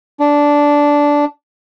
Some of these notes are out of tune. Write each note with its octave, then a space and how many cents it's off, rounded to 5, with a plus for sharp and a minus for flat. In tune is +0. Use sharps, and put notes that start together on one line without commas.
D4 -10